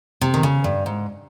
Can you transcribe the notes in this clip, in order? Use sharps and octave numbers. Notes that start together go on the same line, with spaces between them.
C3
D#3
C#3
G2
G#2